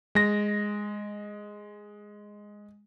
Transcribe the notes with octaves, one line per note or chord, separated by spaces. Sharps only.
G#3 A#6